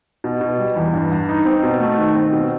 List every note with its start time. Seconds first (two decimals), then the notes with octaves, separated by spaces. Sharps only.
0.24 B2
0.41 B2
0.58 G3
0.76 E2
0.93 G2
1.11 G2
1.29 D#4
1.45 C4
1.63 B2
1.80 A3
1.98 D#3
2.15 C4
2.32 B2